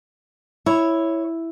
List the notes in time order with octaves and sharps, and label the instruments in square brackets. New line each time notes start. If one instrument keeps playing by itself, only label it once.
[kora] E4 [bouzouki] C#5